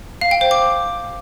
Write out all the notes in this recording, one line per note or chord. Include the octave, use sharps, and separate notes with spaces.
F5
G5
C5
D6